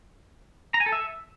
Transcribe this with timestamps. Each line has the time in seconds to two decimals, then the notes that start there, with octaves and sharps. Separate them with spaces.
0.74 A#5
0.80 G#5
0.86 A4
0.92 E5